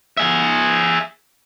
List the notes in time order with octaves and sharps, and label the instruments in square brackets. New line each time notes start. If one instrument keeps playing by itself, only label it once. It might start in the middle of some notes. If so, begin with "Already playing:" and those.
[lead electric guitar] G#4 E5